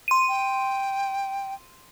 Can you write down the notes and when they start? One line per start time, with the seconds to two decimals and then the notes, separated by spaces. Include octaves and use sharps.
0.08 C6 D#7
0.29 G5